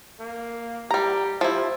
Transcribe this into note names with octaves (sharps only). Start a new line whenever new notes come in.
A#3
G3 G4 A#5
F3 E4 G4